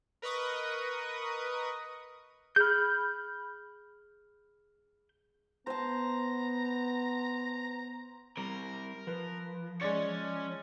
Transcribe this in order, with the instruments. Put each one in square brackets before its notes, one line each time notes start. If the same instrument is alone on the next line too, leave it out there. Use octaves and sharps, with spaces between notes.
[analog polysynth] A#4 B4 D#5 C#6 D#6
[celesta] G#4 F6 [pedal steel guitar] B5 G6
[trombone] B3 [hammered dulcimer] C5 A5 [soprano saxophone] A#5
[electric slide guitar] G3 C4 [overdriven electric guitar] A#4
[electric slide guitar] F3 [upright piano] B4
[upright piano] G#3 D5 [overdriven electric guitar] C#4 C#5